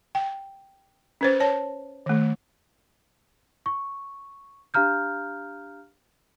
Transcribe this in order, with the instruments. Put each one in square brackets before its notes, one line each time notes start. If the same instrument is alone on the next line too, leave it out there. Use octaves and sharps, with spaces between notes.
[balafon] G5
C#4 B4 C5
C#5 A5
D#3 A3
[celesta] C#6
D4 G4 F5 A#5 F6 G6